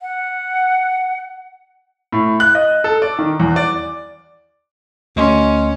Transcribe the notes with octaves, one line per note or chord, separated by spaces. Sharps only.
F#5
A2
F#6
D#5
A4
D5
D#3
E2
D5
D2 C#4 D#5 C6